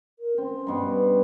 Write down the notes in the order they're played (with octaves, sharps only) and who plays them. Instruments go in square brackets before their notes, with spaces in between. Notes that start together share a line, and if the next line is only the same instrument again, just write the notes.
[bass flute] A#4
[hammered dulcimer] C4 [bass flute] C#4
[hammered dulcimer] G2 B2 G3